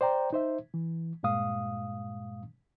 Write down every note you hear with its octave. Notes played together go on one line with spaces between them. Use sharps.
C5 D5 G5 A#5
D#4 C5 E5
E3
G2 A#2 G#3 F5 D#6